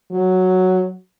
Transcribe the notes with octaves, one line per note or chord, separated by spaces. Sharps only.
F#3